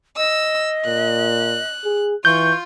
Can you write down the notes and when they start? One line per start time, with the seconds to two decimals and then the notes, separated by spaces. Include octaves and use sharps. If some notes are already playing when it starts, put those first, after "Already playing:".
0.17 D#5 E6
0.87 A#2 F#6
1.85 G#4
2.25 E3 F4 C#6 G6